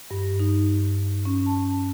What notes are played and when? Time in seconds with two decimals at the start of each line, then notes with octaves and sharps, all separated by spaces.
0.11 G2
0.40 D#4
1.25 C#4
1.46 A5